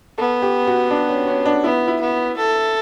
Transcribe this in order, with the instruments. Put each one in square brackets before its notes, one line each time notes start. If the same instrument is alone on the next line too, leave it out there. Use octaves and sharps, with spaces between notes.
[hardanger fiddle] B3 [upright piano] A4
[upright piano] G4
F#4
D4
C#4
C#4
D4
[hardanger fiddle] B3 [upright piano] E4
[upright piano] E4
[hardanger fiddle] B3
A4